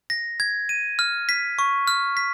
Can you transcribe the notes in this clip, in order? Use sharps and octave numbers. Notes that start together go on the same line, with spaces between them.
A#6
G#6
D#7
F6
B6
C#6
F6
B6